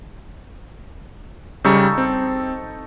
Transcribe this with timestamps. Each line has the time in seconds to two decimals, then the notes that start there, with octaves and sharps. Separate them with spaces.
1.64 C#3 G3 D#4 A4 C#6
1.98 C4